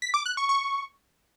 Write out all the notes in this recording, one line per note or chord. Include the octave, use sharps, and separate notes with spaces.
B6
D6
F#6
C#6
C#6